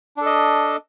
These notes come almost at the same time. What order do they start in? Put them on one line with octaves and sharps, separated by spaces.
D4 A4 D#5